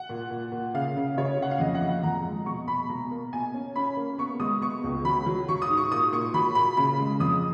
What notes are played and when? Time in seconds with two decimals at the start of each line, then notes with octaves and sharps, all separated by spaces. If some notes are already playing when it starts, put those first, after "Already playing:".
Already playing: F#5
0.09 A#2
0.31 A#2
0.52 A#2
0.74 C#3 F5
0.96 C#3
1.17 C#3 C#5
1.39 C#3 F#5
1.51 F5
1.60 F2 D#5
1.75 F#5
1.81 F2
1.89 F#5
2.03 F2 A#5
2.25 G#3
2.46 B2 C#6
2.67 B2 B5
2.89 B2 A#5
3.11 A#3
3.33 B2 G#5
3.54 C#4
3.76 C#4 B5
3.97 A#3
4.18 B3 C#6
4.40 G#3 D#6
4.61 B3 C#6
4.84 C#2
5.05 F#3 B5
5.26 F#3
5.48 F#3 C#6
5.62 D#6
5.70 G#2
5.77 C#6
5.91 A#2 D#6
6.12 A#2 C#6
6.34 F#3 B5
6.55 A#2 B5
6.77 C#3 B5
6.99 G#3
7.20 F2 D#6